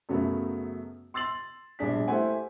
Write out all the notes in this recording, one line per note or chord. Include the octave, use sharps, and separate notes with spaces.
F#2 C#3 F#3 A3 B3
C6 E6 A6 C7 F#7
A#1 B2 G3 D4 G#4 B6
A3 E4 G4 C5 F#5 G#5